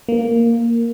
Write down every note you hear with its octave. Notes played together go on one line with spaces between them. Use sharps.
A#3